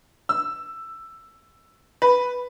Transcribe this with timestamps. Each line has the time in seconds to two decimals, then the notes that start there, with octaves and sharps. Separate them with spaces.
0.29 E6
2.02 B4